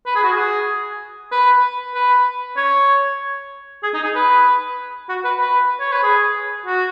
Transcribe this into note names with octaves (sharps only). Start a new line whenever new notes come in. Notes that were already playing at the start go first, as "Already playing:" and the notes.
B4
G#4
F#4
G#4
B4
B4
C#5
G#4
D#4
G#4
B4
F#4
B4
B4
C#5
B4
G#4
F#4